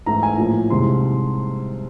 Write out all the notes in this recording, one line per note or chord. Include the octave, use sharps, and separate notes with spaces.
G#2 E3 A3 A#5
G#5
A2 F3 A#3
C2 C3 D#3 G#3 C6